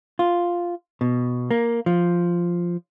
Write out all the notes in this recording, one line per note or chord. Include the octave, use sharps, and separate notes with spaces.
F4
B2
A#3
F3